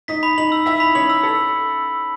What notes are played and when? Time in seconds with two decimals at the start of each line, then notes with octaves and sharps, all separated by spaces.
0.08 D#4 D#5 B6
0.23 B5
0.38 D#4 D#5 F#7
0.52 E6
0.66 E4 E5 B6
0.80 B5
0.95 C#4 C#5 F#7
1.10 E6
1.23 A4